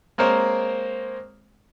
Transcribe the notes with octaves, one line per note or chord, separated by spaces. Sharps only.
G#3 A#3 C4 A#4 C5 C#5